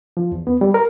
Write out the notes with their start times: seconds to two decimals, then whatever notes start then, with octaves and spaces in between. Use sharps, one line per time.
0.17 F3
0.32 E2
0.47 B3
0.61 G3
0.74 A#4